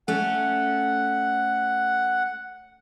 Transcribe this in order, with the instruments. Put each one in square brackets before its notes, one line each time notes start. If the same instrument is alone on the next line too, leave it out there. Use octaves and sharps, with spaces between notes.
[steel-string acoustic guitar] A3 C#4 [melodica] F#5